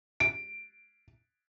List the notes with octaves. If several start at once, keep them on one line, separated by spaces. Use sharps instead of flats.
D7